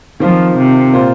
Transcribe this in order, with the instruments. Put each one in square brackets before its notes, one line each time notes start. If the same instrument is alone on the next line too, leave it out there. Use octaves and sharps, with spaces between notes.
[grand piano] D#3 C4 F4 C5 [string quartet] F3
[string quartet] C3
[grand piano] A#2 A#3 F4 C5